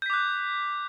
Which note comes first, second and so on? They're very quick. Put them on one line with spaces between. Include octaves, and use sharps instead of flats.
G6 B6 D6 F#6